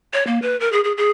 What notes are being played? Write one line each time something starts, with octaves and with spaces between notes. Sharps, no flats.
C#5
A#3
B4
A#4
G#4
G#4
G#4